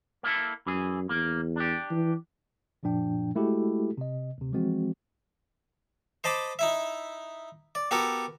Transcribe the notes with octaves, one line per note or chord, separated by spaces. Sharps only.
A#3 E4 A4
F#2 E3 G#4
E2 A#3
D4 G4
E3
F#2 A#2 F3 D4 G5
G#3 A3 E4 F#4 G4 A4
C3 D#5
D2 C3
E3 F3 G#3 C4 F#4
C5 D#5 A5 B5 D6
D#4 E4 E5
D5
B3 F#4 G4 A4 A#4